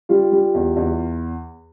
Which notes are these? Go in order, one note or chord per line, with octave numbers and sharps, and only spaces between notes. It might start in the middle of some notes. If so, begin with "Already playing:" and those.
G3 F4
G3
E2
E2